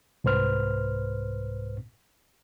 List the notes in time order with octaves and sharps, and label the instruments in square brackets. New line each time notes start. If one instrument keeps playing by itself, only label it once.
[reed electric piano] C2 G#2 B4 C5 F6